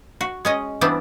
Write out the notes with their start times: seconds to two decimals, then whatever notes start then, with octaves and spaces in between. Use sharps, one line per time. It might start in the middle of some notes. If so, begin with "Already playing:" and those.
0.21 F#4
0.45 G#3 C#4 D#5
0.81 E3 G3 B3 C4 D4